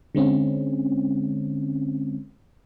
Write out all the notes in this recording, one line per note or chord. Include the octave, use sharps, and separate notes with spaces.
D3 G#3 C4 C#4